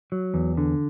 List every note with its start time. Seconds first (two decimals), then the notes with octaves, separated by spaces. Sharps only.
0.12 F#3
0.34 E2
0.57 D3